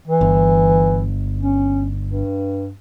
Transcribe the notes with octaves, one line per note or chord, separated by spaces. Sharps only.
E3
G1
C#4
G2